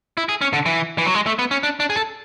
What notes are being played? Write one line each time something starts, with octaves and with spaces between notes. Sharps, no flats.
E4
G#4
C#4
D3
E3
E3
F#3
G#3
A3
B3
C#4
D4
D4
G#4
A4